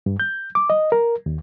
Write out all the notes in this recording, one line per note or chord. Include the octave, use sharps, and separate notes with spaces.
G2
G6
D6
D#5
A#4
D#2